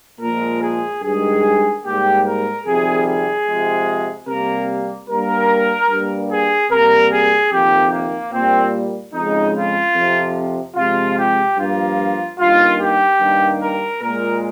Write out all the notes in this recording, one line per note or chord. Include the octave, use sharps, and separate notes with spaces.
A#2 F3 G#3 A#4
G#4
G2 D#3 G#3 G#4
G#2 G3 A#3 G4
A#4
F2 C3 D#3 G3 G#4
G#4
C3 F3 G#3
C3 G3 A#3 A#4
G2 G3 A#3 A#4
G2 G3 A#3
G#4
C3 G3 A#3 A#4
G#4
F2 C3 D#3 A#3 G4
A#3
A#2 G3 A#3 C4
F2 C#3 G#3 D#4
F4
F2 C3 F3
C3 F3 G#3 F4
G4
G2 F3 A#3 F4
G2 D#3 A#3 F4
G4
G2 D#3 G3 A#3
A#4
A#2 G#3 A#4